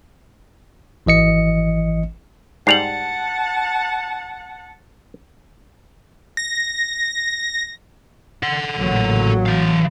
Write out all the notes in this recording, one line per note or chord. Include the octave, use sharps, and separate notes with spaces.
G#1 E3 D#5 C#7
G#2 G3 F#5 A5 C7 F7 F#7
A#6
A4 F#5
A1 A#2 F#3
E3 F5